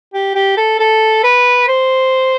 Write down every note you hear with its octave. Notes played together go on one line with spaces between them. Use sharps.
G4
G4
A4
A4
B4
C5